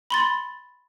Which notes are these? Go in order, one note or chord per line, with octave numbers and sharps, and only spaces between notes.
B5 C6 A6